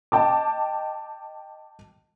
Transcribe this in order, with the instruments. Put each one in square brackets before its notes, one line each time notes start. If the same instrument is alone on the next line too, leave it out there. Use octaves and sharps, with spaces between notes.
[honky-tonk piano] D#5 G5 A5 D6